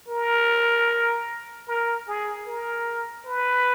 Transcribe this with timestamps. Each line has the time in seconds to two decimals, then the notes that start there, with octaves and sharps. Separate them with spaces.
0.08 A#4
1.68 A#4
2.08 G#4
2.47 A#4
3.26 B4